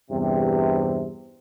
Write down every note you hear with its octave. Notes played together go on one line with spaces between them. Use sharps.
E2 G2 C3